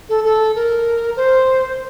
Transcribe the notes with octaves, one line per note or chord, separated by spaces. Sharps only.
A4
A4
A#4
C5